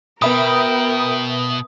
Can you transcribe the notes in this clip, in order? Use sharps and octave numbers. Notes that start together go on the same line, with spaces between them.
B2 B3 A#4 E5 G5 B5 D#6